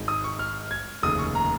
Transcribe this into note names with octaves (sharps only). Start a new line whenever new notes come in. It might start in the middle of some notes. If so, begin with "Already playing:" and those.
Already playing: G#1 G#2 G#3
D#6
C#6
F6
G#6
F1 D#2 C#3 D#6
C#6
A#5